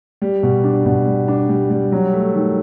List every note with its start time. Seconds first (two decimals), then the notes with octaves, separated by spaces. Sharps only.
0.22 G3
0.43 B2
0.64 D4
0.86 B2
1.07 G3
1.28 D4
1.49 G3
1.70 G3
1.92 F#3
2.13 A3
2.35 D#3